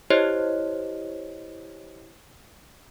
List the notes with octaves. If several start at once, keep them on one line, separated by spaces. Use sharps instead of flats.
E4 G4 C5 C#5 D#5